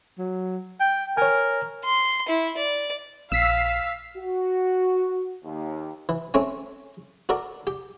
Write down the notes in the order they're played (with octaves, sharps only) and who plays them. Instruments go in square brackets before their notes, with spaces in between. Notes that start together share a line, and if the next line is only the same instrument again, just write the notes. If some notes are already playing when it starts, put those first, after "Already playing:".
[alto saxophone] F#3
G5
[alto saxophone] A#4 [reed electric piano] C#5 G#5
[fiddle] C6
E4
D5
[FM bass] A#1 [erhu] F5 [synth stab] E6 B6 C7
[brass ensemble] F#4
D#2
[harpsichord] E3
A3 C4 C#4 G#5
F#4 A4 A#4 D5
G4